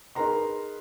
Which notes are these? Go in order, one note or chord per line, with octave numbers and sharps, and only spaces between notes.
D#4 G#4 A#4 B4 A#5 C6